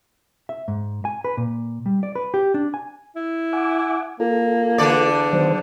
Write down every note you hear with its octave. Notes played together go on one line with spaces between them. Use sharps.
E5
G#2
G#5
B4
A#2
G3
D5
B4
G4
D4
G#5
E4
F#5 G#5 D6
A#3 F4 A4
E2 D3 D5
D#3 F#3 B3 C5